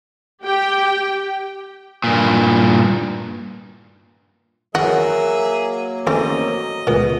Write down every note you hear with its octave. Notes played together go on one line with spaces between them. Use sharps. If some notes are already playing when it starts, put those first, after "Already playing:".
G4 G5
G2 A#2
E2 F#3 A#3 F#4 G#4 E5
E2 A3 C4 C#4 D#5
C#2 A#2 A3 B3